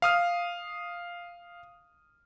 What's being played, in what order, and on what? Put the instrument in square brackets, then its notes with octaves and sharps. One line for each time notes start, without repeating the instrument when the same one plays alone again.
[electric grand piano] F5 D#6 F6